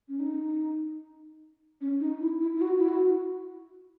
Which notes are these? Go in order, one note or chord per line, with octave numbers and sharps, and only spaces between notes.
C#4
D#4
C#4
D#4
E4
E4
E4
F#4
E4
F#4